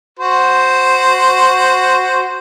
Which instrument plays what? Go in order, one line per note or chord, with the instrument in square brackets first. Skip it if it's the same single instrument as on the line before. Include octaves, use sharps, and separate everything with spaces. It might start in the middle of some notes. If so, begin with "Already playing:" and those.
[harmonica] F#4 C5